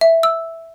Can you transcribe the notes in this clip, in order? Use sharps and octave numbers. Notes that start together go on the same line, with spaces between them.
E5
E6